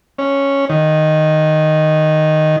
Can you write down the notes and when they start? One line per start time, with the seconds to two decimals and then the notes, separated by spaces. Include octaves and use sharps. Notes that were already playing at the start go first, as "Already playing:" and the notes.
0.18 C#4
0.70 D#3